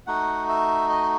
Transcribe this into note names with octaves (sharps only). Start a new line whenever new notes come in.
A3 D#4 F#4 F#5
E5
D#5